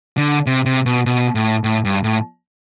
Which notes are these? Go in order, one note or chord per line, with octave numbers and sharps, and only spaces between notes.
D3
C3
C3
B2
B2
A2
A2
G2
A2